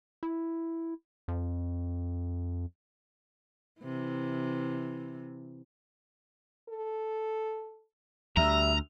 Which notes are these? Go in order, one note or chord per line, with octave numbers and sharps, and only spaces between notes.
E4
F2
C3 E3
A4
D2 G3 E5 A#5